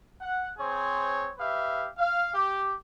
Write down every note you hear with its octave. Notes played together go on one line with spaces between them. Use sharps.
F#5
C4 G#4 C5 C#5
G4 B4 E5 F5
F5
G4 D6